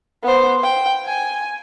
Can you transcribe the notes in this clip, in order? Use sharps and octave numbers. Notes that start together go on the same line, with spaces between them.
B3 C5
G5
G#5